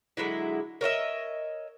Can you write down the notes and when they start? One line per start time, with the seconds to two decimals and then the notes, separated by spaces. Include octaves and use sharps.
0.17 D3 F#3 G#3 E4
0.81 A#4 C#5 D#5 E5